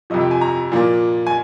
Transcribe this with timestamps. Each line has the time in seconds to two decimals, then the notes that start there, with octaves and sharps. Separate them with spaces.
0.10 F2 C3 F3 D#5
0.21 G5
0.31 G#5
0.41 A#5
0.72 A#2 F3 A#3
1.27 G#5